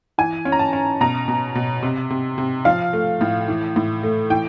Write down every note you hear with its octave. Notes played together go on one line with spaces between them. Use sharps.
E3 G#5
C#4
A#5
A5
C#4
B2 A#5
B2
B2
C3
C3
C3
F3 F5
A3
A2
E3
A2
A3
E3 G5